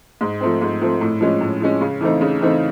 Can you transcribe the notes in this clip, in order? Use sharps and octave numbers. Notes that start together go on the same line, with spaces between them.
G#2
F3 A3 C4
G#2
F3 A3 C4
A2
F3 G#3 C#4
A2
F3 G#3 C#4
C#3
E3 A3 C4 D#4
C#3
E3 A3 C4 D#4